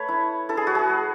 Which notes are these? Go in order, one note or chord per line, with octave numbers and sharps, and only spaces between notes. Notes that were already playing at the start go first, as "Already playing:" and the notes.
Already playing: A3 B4 C#5
E4
E4 A4
G#4
F#4
G#4
A3